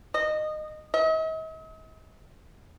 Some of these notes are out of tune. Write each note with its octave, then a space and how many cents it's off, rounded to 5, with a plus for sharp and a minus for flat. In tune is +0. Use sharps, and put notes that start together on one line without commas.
D#5 -20
D#5 +45